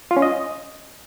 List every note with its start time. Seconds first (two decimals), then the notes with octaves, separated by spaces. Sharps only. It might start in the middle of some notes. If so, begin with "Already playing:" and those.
0.11 F4
0.17 C#4
0.22 D#5